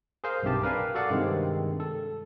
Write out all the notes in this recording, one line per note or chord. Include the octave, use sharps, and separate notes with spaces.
G#4 A#4 C5 F5
B1 G2 C3 G4 A5
A#4 B4 D5 F5 G#5
F#4 A4 D5 F5 F#5
G2 C3 D#3 G#3 C4
A4